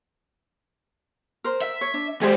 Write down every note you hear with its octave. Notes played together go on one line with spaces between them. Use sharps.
A#4 C5
E5
C#5
D4
G#3 G4 G#4 C5 D5